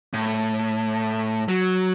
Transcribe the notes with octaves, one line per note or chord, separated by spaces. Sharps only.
A2
F#3